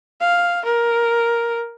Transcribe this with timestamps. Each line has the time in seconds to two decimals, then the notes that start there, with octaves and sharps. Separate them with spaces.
0.20 F5
0.65 A#4